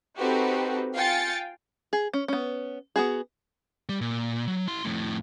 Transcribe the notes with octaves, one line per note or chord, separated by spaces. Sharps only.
C4 D#4 F#4 G4 A4 B4
F4 F5 G5 G#5 A6 C#7
G#4
C#4
B3 C#4
B3 F#4 G#4
G3
A#2
F#3
E4 C6
F2 A2